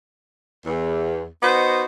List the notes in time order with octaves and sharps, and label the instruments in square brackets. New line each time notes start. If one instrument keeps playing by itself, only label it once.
[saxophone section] E2
B3 D#4 F#4 C5 D#5